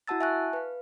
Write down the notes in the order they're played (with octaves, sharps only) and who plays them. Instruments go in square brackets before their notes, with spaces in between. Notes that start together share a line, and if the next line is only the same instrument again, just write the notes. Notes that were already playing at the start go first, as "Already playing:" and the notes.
[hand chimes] E4 F#4 F#5 A5 E6 A6
E5 G#5 A5 C#6 F#6
B4 F5